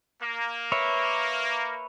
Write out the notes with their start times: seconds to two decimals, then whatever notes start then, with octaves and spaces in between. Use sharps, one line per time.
0.20 A#3
0.72 B4 C#5 E5